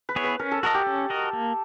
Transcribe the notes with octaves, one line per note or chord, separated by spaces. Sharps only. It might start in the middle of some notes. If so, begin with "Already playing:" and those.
B4
B3 E4 G#4 C#5
B4
C#4 A#4
A4
F#4 A4 A#4 D#5
G4
C#4
F#4 A#4 D#5
A#3